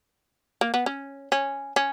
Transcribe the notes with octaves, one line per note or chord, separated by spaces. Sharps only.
A#3
B3
C#4
C#4
C#4